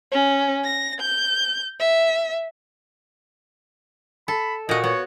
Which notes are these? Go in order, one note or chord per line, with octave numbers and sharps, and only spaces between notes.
C#4
A#6
G6
E5
A4 B5
A#2 F#4 D#5
B3 C#5